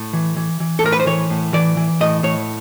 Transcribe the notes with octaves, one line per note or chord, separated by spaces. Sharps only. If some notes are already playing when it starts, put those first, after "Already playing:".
Already playing: A2
E3
E3
E3
A4
A2 A#4
B4
C5
E3 C#5
A2
E3 D5
E3
A2 D#5
A2 C#5